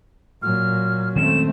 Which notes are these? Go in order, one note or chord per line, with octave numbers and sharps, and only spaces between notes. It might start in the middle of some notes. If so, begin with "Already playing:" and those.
A#2 F#3 F6
D#3 G#3 A3 C4 C#4 E7